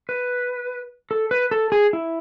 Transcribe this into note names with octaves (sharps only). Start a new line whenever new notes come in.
B4
A4
B4
A4
G#4
E4